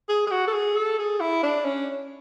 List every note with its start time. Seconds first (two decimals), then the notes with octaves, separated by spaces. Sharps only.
0.09 G#4
0.27 G#4
0.32 F#4
0.48 A4
0.53 G#4
0.77 A4
0.99 G#4
1.20 E4
1.43 D4
1.65 C#4